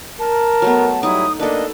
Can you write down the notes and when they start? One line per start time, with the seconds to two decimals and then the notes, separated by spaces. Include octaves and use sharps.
0.19 A#4 A5
0.62 F#3 A3 B3
1.03 F#3 G3 D#4 E4 D#6
1.39 A#3 D4 A4 B4 D#5